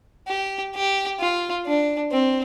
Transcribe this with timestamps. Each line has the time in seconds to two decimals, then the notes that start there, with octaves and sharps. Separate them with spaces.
0.28 G4
0.75 G4
1.20 F4
1.66 D4
2.12 C4